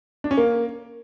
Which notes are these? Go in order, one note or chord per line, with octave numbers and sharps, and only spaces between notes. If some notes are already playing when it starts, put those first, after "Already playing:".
D4
C#4
A#3